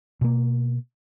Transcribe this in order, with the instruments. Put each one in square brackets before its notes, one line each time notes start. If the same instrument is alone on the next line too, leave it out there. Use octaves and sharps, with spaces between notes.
[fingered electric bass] B2 A#3